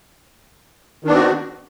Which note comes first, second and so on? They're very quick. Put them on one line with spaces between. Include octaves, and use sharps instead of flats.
D#3 D4 B3 C4 F#4